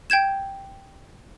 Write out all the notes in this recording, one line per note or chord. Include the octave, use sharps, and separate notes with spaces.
G5 G6 G#6 E7